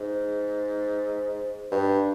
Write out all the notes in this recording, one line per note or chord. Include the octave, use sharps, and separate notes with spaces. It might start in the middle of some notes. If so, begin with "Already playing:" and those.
Already playing: G#2
G2